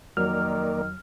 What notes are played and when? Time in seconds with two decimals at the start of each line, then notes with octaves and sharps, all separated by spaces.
0.17 F2 D#3 F#3 A#3 A#4 D5 F6